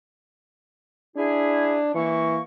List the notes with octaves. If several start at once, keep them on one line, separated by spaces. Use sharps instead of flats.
D4 E4 G#4
E3 A#3 C#6